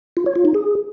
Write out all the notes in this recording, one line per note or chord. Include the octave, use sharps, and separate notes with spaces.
F4
C#5
F4
D#4
G#4